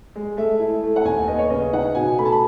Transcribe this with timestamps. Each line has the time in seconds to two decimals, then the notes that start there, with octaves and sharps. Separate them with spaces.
0.15 G#3
0.37 A3 E5
0.59 E4
0.83 A3
0.96 F#5
1.05 D#2 G#5
1.28 B3 D#5
1.39 C#5
1.50 C#3 D#5
1.73 D#4 F#5
1.95 B2 G#5
2.18 A3 B5
2.25 A5
2.32 B5